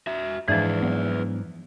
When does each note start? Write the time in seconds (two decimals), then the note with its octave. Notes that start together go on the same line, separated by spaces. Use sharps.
0.07 F#4 E5
0.48 G#2 E3 F3 D4 E4 G#4 B4
0.83 F#3 B3